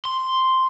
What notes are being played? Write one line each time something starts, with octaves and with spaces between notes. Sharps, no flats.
C6